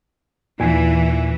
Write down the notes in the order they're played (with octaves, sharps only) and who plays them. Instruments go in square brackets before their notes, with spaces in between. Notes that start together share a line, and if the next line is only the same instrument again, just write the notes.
[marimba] D#2 [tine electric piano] A#2 G#5 [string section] E3